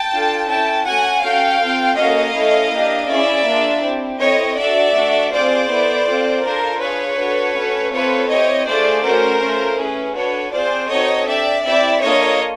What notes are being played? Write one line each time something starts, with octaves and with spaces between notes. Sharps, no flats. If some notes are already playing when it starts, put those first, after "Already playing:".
Already playing: G5 A5
D4 F4 A4
C#4 E4 A4 G5 A5
A3 C#4 F#4 A4 F#5 G#5
C#4 F#4 A4 F5 G5
C4 F4 A4
A#3 C#4 F#4 A4 D#5 F5
A3 C#4 E4 A4
A#3 D4 G4
C#4 E4 G#4 D5 E5
A#3 D4 F4 G#4
C4 E4 G4
C4 E4 A4 C#5 D#5
D4 F#4 A4 D5 E5
A3 D4 F#4 A4
C4 F4 G#4 C5 D5
B3 E4 A4
C4 F4 A4
D4 F4 A4 A#4 C5
D4 F4 G#4 B4 C#5
D4 F#4 A4
A3 C#4 F#4 A4
C4 F4 A4 B4 C#5
C4 E4 G4 C#5 D#5
A3 D4 F4 G#4 C5 D5
A3 C#4 F#4 A#4 C5
A3 C#4 F4
C#4 E4 G#4 B4
D4 F#4 A4 B4 C#5
C4 F4 G#4 C5 D5
C4 D#4 F#4 A4 C#5 D#5
D4 G4 D5 E5
C4 E4 G4 D5 E5
A#3 D4 F4 A4 C#5 D#5